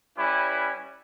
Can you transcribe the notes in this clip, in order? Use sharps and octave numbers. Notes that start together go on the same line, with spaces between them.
G3 C#4 E4 B4